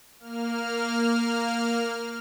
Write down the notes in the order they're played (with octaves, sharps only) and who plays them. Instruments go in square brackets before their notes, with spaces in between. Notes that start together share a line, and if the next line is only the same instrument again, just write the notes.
[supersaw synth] A#3 F6